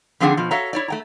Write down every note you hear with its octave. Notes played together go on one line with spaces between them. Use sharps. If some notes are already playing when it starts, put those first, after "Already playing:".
D3 F3 C4 D4 G#4 F#5
B2 F3
F#4 A4 C#5 E5 F5 A#5
E4 C#5 D5
A3 G5 A#5